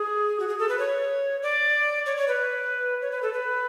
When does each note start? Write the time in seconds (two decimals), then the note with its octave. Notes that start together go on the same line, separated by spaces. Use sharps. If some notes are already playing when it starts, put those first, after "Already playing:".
Already playing: G#4
0.39 F#4
0.48 G#4
0.59 A4
0.69 B4
0.79 C#5
1.42 D5
2.06 C#5
2.17 C#5
2.28 B4
3.01 C#5
3.12 B4
3.22 A4
3.33 B4